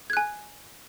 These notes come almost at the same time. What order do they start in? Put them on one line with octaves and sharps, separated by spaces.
G#6 F#6 G#5